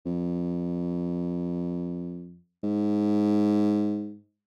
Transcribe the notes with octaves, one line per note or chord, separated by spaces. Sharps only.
F2
G#2